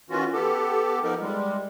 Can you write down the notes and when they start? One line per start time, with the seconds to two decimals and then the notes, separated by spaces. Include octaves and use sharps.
0.10 D#3 E3 C#4 F4 F#4
0.33 B3 G4 A4
1.04 F3 B3 D#4 A#4
1.21 G3 G#3